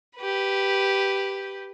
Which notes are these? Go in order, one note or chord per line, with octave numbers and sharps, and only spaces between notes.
G4 B4